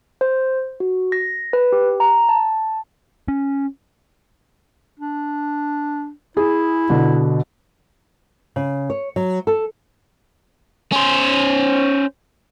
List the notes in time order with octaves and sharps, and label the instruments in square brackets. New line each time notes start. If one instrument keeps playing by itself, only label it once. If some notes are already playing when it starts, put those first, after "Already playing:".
[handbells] C5
F#4
A#6
B4
G4
A#5
A5
[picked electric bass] C#4
[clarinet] D4
[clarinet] E4 [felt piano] G#4
[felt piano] B2 D3
[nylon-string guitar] C#3
C#5
F#3
A4
[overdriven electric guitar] C#4 C5